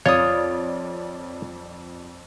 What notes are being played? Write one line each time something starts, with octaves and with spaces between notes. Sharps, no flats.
F2 F4 C#5 D5 D#6